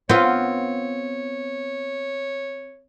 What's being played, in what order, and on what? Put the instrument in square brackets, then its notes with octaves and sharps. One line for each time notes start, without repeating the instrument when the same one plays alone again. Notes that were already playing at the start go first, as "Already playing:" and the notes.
[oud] B3 F4 [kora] C4 [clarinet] C#5